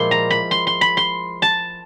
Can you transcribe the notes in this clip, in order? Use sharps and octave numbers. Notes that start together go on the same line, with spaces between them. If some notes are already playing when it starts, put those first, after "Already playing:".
Already playing: A#2 F3 G#3 E4 C6
A#5
B5
C6
C6
B5
C6
A5